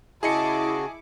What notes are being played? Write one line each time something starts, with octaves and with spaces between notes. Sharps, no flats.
C#3 E4 F#4 G#4 D#5 A5 D6 C#7